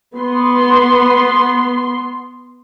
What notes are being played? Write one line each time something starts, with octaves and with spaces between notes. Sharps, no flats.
B3 C6